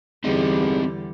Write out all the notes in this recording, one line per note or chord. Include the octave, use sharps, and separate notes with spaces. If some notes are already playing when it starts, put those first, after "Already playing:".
E2 D3 G3 C4 D#4 G#4 D#5